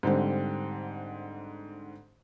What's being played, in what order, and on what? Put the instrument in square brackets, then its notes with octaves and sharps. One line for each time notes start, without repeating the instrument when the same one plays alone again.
[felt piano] G#2 D3 G3 C4